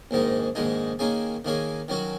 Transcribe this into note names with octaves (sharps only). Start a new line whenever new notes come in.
A#1 G#2 D#3 G#3 D#4
A#1 G#2 D#3 G#3 D#4
D#3 A#3 C#4 G#4
D#3 A#3 C#4 G#4
D#3 F#3 C#4 F#4